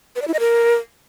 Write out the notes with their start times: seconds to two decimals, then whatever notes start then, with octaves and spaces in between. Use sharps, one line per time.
0.16 B4
0.22 D5
0.28 E4
0.34 D#5
0.40 A#4